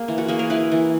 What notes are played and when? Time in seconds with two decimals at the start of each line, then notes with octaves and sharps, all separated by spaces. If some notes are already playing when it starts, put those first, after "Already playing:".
Already playing: A#3 G#4
0.08 E3
0.18 F#4
0.28 A#3 G#4
0.39 A#4
0.50 E4 B4
0.72 E3